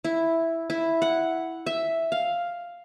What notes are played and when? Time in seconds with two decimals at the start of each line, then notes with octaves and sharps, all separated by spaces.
0.04 E4
0.70 E4
1.02 F#5
1.66 E5
2.12 F5